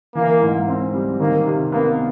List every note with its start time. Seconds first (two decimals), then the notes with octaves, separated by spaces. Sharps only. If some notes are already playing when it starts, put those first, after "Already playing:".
0.15 E3 A#3
0.42 G#2
0.68 C4
0.94 G3
1.20 D#3 A#3
1.46 C3
1.72 A#3 B3